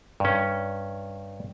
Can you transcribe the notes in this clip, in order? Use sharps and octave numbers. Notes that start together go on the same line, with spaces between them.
G2 C#4